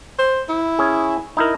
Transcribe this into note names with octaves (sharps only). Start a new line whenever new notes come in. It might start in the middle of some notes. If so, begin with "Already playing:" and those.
C5
E4
C#4 G#4
D#4 E4 A#4